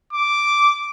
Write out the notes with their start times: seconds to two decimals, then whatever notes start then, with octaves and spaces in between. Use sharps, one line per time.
0.13 D6